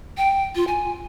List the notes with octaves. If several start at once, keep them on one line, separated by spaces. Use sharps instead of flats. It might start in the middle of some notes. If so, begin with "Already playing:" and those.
G5
F4
G#5